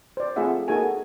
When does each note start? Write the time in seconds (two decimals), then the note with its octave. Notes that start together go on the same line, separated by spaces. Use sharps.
0.17 C5 D5
0.36 A3 C4 F4 G#4 E5 F#5
0.68 A#3 D#4 F#4 G#4 A4 G#5